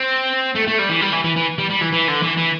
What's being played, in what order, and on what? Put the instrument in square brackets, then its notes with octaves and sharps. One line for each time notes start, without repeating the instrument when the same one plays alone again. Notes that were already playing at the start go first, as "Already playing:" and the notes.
Already playing: [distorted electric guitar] C4
A3
A3
G3
E3
G3
E3
E3
E3
G3
G3
E3
E3
D3
E3
E3